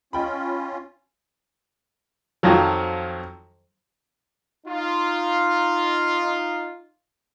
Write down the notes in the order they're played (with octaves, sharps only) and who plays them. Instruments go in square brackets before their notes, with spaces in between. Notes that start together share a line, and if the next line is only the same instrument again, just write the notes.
[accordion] C#4 F4 [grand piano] D#5 G5 B5
[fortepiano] F2 D#3 F3 F#3
[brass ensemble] D#4 F4